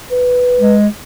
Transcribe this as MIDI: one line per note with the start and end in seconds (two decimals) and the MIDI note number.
0.11 0.77 71
0.60 0.88 56